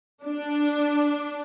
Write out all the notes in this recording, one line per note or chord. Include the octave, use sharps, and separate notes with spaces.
D4